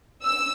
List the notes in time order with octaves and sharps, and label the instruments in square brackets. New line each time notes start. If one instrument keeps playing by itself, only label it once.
[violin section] E6